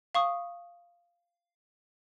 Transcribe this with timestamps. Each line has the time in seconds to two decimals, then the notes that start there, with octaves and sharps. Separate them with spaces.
0.15 F5 C#6 D#6